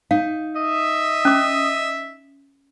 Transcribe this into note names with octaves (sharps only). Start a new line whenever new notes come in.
D#4 F5
D#5 E5
C#4 D6